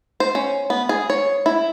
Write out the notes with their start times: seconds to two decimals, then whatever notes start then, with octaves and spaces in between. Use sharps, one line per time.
0.20 C5
0.35 C#4
0.70 B3
0.89 G#4
1.10 C#5
1.46 E4